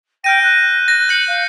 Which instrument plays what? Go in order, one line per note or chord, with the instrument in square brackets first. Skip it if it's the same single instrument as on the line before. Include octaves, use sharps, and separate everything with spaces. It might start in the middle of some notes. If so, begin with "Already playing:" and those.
[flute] G5 [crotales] F6 G6 D#7 [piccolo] A#6
[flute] F#6
[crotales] A#6
[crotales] G6 C#7 [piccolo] F#7
[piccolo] F5